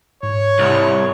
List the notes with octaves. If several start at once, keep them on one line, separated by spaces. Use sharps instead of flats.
G#2 C#5
C2